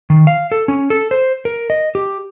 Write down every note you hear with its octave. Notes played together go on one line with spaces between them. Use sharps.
D#3
F5
A4
C#4
A4
C5
A#4
D#5
G4